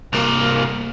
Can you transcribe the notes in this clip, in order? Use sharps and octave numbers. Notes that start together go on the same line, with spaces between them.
C2 A#3